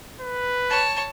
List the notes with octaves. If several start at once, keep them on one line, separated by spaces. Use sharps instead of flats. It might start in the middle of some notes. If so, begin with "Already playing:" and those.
B4
C#5 A5